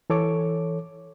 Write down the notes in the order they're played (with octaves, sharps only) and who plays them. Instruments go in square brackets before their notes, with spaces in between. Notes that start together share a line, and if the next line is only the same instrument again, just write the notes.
[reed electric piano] E3 A4 C#5 D6